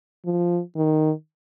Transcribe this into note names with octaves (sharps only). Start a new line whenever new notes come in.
F3
D#3